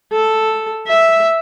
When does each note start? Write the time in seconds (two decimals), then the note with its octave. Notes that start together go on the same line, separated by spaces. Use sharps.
0.13 A4
0.88 E5